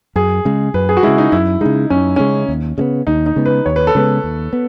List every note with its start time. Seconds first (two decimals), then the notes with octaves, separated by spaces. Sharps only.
0.16 F#2 G#4
0.45 C#3 G#3
0.74 F#2 B4
0.89 G#4
0.97 F#4
1.03 G#3 E4
1.07 C#3
1.18 D#4
1.32 F#2 E4
1.61 G#3 D#4
1.66 C#3
1.90 F#2 C#4
2.16 C#3 G#3 C#4
2.49 D#2
2.78 C#3 G#3 B3
3.07 D#2 D#4
3.26 D#4
3.36 C#3 G#3 B3
3.46 B4
3.66 D#2 C#5
3.76 B4
3.87 A4
3.95 C#3 G#3 B3 B4
4.24 D#2
4.53 B3